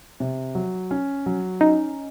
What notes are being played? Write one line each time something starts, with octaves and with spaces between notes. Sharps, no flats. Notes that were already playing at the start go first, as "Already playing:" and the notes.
C3
F#3
C#4
F#3
C#4 D#4